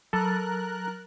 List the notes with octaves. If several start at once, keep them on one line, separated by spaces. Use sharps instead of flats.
F#3 A4 A#4 F#6 A6